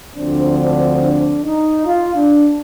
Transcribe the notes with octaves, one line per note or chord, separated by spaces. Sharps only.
D2 D3 F3 C4 D4
D4
D4
D#4
F4
D4